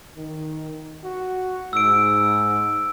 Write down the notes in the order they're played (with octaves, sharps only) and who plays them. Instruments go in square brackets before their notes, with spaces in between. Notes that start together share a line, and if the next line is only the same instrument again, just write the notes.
[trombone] D#3
F#4
[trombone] G#2 [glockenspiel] E6 D7